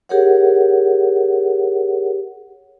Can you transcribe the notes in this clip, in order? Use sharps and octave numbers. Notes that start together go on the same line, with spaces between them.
G4 G#4 A#4 C#5 F#5